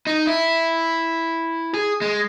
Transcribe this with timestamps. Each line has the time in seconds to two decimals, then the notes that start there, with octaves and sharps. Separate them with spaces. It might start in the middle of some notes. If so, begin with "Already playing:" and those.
0.07 D#4
0.27 E4
1.74 G#4
2.01 G#3